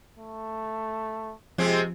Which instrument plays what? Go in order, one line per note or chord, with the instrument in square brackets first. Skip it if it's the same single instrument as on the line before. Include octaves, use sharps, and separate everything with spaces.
[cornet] A3
[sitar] C3 G#3 C4 [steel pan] F3